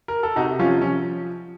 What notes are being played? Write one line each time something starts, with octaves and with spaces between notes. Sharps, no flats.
A#4
A4
C3 D#4 F#4
F3 C#4 F4
F3 C#4